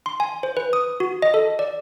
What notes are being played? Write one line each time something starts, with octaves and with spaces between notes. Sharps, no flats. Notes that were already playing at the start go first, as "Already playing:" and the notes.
C6
G#5
C5
B4
D#6
F#4
D#5
A4
D5